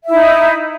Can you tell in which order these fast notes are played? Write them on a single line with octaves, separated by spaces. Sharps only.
E5 E4 D#4